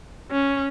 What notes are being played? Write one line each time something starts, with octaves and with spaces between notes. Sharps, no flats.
C#4